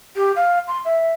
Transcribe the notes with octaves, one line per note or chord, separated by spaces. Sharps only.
G4
F5
C6
E5